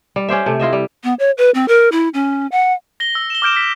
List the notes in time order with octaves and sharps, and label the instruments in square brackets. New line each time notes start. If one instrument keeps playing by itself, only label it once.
[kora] G3
C#4 G4 C5 E5
C3 A3
E4 F4 D#5 E5
G3
[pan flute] B3
C#5
B4
C4
A#4
E4
C#4
F#5
[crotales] A#6 G7
E6
E7 G7
D6 F6 G6 D7 E7
B6